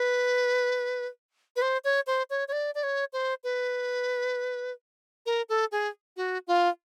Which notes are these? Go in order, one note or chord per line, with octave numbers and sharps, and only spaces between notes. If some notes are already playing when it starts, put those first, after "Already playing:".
Already playing: B4
B4
C5
C#5
C5
C#5
C#5
D5
D5
C#5
C5
B4
A#4
A4
G#4
F#4
F4